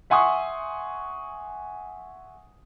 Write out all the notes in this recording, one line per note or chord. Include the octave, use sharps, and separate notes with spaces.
E5 F#5 G#5 C6 C#6 D#6